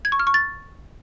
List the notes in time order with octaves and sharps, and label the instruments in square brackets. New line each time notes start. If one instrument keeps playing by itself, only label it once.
[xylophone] G#6
C#6
F6
C#6
A6